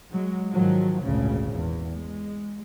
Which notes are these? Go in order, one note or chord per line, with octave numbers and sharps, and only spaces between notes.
F#3 G#3
G#2 D#3 F3 F#3
G#1 D2 A#2 C#3
E2
G#3